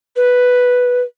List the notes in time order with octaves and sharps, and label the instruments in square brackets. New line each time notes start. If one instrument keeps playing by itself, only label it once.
[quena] B4